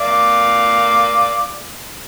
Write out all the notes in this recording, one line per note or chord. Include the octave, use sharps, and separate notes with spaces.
D5 F5